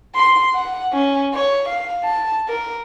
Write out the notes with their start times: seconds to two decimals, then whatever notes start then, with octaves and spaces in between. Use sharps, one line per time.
0.15 C6
0.54 F#5
0.92 C#4
1.34 C#5
1.69 F5
2.03 A5
2.48 A#4